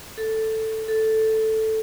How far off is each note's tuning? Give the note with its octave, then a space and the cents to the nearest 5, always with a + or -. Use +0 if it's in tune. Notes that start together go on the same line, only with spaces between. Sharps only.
A4 +5
A4 +0